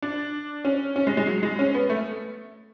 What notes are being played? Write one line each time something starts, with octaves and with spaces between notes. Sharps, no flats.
D4
C#4
C#4
G#3
G#3
F#3
G#3
C#4
B3
A3